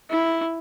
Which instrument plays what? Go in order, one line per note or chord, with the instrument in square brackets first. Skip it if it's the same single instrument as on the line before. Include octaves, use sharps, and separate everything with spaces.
[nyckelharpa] E4